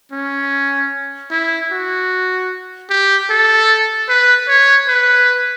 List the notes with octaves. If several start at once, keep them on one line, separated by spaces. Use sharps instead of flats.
C#4
E4
F#4
G4
A4
B4
C#5
B4